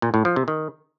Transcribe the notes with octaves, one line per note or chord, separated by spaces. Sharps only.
A#2
A2
F3
C3
D#3